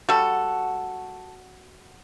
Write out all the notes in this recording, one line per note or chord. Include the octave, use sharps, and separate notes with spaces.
G3 F#4 A4